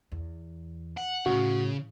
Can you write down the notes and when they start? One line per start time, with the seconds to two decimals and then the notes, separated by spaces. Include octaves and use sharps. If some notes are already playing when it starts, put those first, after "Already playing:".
0.12 E2
0.97 F#5
1.26 A2 C#3 F#4